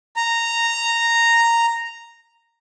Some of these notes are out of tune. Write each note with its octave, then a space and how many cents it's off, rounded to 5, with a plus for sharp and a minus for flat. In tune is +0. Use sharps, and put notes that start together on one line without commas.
A#5 -10